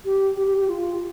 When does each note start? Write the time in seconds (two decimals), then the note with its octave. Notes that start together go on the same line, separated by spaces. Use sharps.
0.05 G4
0.37 G4
0.47 G4
0.58 G4
0.68 F4